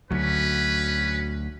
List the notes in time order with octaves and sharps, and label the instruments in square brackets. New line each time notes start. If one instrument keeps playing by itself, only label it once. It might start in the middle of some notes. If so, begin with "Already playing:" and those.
[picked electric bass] D2 F#3 [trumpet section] C#4 B4